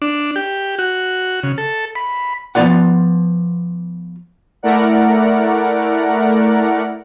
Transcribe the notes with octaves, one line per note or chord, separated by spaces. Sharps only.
D4
G4
F#4
C#3
A4
B5
F3 B3 F4 D5 F#5
A3 E4 A#4 D5 F#5